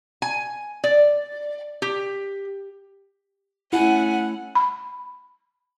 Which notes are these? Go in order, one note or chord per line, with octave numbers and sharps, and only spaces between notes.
G#5
D5
G4
A3 C#4 E4 F#5 G#5
B5